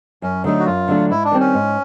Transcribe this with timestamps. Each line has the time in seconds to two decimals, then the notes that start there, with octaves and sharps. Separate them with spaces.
0.22 F#2 C#4
0.44 D3 F#3 A3 D4 D#4
0.59 F#4
0.66 F#2 F4
0.88 D3 F#3 A3 D4
1.10 G#2 E4
1.24 D4
1.32 D#3 G3 C4
1.40 C#4
1.54 G#2